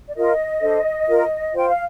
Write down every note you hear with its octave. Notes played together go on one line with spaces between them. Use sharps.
D5
F4 A#4 D#5
D4 A4 C5
F4 A#4
F4 C5 G5
F5